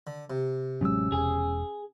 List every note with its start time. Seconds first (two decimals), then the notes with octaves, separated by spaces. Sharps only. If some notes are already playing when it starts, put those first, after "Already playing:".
0.07 D3
0.30 C3
0.81 A1 F#3 G#3 C#4 E6
1.12 E1 G#4